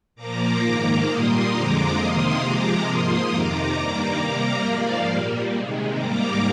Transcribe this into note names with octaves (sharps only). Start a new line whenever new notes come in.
A#2 F3 A#3 A#5 D6
G#2 D#3 A#3 A#5 D6
A#2 G3 A#3 C6 D#6
F2 D3 F3 G#3 A#5 D6
C3 D#3 A#3 C6 D#6
C3 F3 G#3 A#5 D6
G#2 F3 A#3 C6 D#6
F2 C3 D#3 A#5 D6
G2 D#3 G3 A#3
C3 G3 A#3
G#2 F3 A#3 D5 F5
A#2 G3 A#3
C3 D#3 G#3
G#2 G3 A#3 A#5 D6